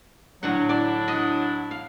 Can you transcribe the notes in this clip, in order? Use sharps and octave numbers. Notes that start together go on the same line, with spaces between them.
A2 D3 F#3 F#5
F#3 D4 E4 D5
D#5 F#5
F5